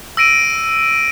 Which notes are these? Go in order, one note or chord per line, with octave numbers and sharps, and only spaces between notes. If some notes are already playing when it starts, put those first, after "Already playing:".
E6 A#6 D7 D#7